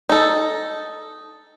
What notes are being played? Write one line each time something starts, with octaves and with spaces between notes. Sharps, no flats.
D#4 A4